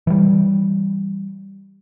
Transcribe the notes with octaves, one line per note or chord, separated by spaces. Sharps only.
E3 G3